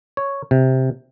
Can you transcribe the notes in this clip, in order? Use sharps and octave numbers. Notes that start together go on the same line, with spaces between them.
C#5
C3